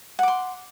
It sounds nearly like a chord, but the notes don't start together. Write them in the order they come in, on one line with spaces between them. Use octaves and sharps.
F#5 D6 C6